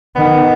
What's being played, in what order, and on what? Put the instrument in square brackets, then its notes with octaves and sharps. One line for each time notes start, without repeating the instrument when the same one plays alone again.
[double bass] D#3 [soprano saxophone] B3